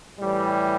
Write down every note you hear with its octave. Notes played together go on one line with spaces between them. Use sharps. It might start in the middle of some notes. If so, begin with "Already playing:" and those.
A2 E3 G3